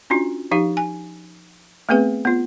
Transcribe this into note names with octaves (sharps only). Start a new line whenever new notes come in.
C#4 D4 F4 F#4
F3 D#4 G4 F5
G#5
A3 B3 C4 G#4 B4
B3 F4